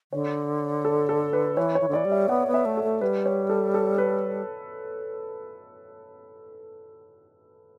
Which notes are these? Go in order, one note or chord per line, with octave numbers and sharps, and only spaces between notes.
D3 C#5
A4
A4
B4
E3 C#5
C#5
E3
D3
E3 D5
G3
E5
B3 F#5
B3
E5
A3
A4
A3
G3 B4
C#5
A4
A4
B4